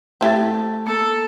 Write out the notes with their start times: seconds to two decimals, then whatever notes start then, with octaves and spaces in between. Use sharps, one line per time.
0.21 A3 C4 E4 G4 A6
0.87 A#3 A4